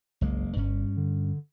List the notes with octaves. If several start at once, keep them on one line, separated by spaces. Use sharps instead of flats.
F#1 C2 G#3 A#3
G1 G2 C#4
D3